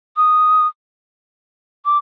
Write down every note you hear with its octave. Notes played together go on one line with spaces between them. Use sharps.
D#6
D6